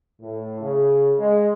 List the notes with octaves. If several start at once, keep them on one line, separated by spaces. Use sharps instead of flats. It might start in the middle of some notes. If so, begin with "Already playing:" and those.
A2
C#3
G#3